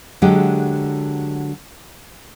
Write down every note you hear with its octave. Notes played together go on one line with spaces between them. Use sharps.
D3 F#3 G#3 G4